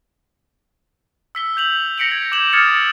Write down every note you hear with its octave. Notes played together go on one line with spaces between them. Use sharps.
E6 B6 G7
G6 F7 F#7
A#6 B6 C#7 D7 F7 F#7
G#6
D6 G6 E7 F#7
D6 D#6 F6 G#6 A6 C#7